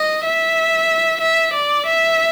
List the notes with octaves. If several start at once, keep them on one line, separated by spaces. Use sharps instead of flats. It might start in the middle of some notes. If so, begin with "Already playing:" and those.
Already playing: D#5
E5
E5
D5
E5